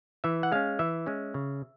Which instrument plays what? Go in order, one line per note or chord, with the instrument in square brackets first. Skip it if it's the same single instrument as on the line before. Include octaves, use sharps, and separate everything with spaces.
[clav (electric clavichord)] E3 E5
F#5
G#3 C#4 F5
E3 E5
G#3 C#4
C#3